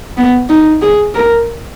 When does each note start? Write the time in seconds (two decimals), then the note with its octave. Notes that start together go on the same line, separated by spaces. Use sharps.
0.18 B3
0.49 D#4
0.82 G#4
1.15 A#4